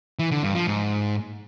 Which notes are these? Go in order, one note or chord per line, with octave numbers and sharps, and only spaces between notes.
E3
D3
G2
F3
G#2